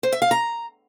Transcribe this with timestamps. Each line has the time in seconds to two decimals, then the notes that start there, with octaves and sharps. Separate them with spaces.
0.03 C5
0.12 E5
0.22 F5
0.31 A#5